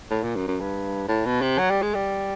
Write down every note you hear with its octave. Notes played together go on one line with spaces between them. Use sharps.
A2
A#2
F#2
F#2
G2
A2
B2
C3
F#3
G3
G#3
G3